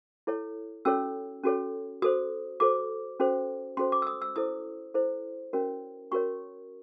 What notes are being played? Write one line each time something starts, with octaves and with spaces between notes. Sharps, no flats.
E4 A4 C#5
C#4 F#4 A4 C#5 E6
C#4 F#4 A4 C#5
F#4 A4 C5 D#6
F#4 A4 C5 D6
C#4 F#4 A4 C5
C#4 F#4 A4 C5 C6
D6
E6
D#6
E6
E4 A4 C5 D#6
E4 A4 C5
C#4 F#4 A#4 C#5
C#4 F#4 A#4 C#5 C#6